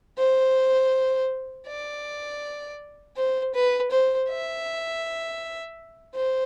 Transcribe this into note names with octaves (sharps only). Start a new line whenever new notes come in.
C5
D5
C5
B4
C5
E5
C5